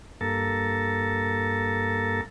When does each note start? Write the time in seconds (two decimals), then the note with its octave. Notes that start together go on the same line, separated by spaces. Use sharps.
0.21 G2 A#3 A4